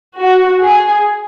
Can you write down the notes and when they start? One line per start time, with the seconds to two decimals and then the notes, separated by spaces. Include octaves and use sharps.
0.20 F#4
0.62 G#4